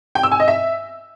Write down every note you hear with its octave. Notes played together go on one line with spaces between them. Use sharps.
G5
E6
G#5
D#5
E5